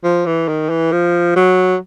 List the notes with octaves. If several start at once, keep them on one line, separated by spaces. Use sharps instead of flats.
F3
E3
D#3
E3
F3
F#3